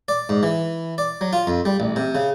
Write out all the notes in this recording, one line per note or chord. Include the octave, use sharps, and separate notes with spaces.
D5
G#2
E3
D5
F#3
F4
F2
G3
A1
C3
C#3